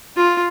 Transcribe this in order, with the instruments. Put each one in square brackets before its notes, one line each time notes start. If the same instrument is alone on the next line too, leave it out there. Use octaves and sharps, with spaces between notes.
[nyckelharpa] F4